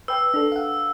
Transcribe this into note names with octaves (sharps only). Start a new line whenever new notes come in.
B4 G5 E6
D4 A4
F5 F#5